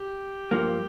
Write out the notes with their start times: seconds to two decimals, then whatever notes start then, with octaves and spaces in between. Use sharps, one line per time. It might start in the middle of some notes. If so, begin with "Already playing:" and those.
Already playing: G4
0.51 G2 F3 A#3